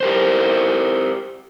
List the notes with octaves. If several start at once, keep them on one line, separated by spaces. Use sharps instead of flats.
G4 A#4 C5